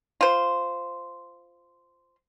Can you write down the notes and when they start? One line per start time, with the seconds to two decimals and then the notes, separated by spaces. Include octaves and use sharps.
0.21 F4 C5